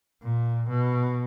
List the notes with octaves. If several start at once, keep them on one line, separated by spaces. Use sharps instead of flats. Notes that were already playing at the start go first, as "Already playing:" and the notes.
A#2
B2